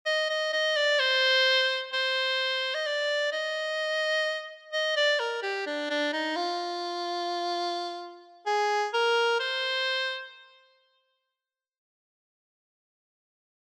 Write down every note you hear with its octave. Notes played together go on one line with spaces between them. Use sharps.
D#5
D#5
D#5
D5
C5
C5
D#5
D5
D#5
D#5
D5
A#4
G4
D4
D4
D#4
F4
G#4
A#4
C5